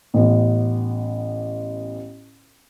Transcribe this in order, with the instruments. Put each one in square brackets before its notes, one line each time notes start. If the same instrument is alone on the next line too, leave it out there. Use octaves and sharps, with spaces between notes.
[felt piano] A1 B3